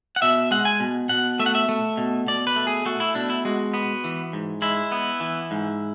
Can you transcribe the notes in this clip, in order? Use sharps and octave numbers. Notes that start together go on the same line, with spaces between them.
F#5
B2 E5
G#3 F#5
G#5
B2
B2 F#5
A3 E5
F#5
E5
A3
B2
B2 D5
B4
A3
G#4
A3 F#4
E4
B2 D4
E4
G#3 F#4
B3
E3
G#2
G#3 E4
B3
E3
G#2